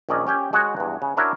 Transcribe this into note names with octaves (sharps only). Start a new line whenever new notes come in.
A#1 D#3 C#4 D5 D#5
C#4 G4 G5 G#5
G#3 F#4 C#5 D#5 F#5
E2 G2
C#3
D4 E4 F#4 A#4 C#5 E5